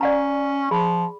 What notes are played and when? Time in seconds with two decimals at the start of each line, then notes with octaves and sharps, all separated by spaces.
0.01 C#4 D5 F#5 A#5
0.71 F3 G#4 B5